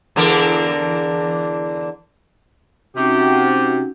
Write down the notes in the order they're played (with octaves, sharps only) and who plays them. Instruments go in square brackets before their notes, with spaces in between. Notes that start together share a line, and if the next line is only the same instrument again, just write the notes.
[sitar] E2 D3 A#4
[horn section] C3 [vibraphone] C#4 D#4 [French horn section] F#4 [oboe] G4